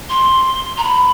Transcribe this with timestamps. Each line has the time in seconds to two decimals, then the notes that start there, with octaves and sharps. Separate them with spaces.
0.09 C6
0.78 A#5
0.84 B5